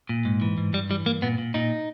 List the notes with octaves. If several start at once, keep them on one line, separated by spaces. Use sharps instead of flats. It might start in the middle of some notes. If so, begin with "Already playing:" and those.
A#2
G#2
E3
G#2
G2 G3
E3 G3
G2 A#3
A#2 B3
A#2
A#2 D#4